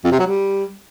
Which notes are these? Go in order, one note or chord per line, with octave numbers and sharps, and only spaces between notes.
F2
C3
F#3
G3